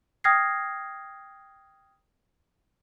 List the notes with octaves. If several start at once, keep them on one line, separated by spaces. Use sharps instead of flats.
G5 D#6 F6 G#6 A#6 C7